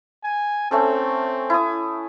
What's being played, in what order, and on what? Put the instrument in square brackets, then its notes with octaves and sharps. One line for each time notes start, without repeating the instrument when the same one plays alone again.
[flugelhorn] G#5
[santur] A3 C#4 A4 [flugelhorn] C4
[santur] E4 D#6